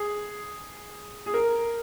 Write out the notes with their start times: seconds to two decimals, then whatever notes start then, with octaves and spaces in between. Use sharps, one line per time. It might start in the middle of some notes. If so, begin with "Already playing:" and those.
Already playing: G#4
1.26 G#4
1.34 A#4